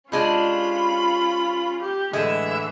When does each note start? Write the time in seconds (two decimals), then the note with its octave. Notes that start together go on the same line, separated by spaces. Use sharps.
0.12 C3 G#3 C#4 D4 F4 B5
1.82 G4
2.13 A2 D3 E3 G#3 E5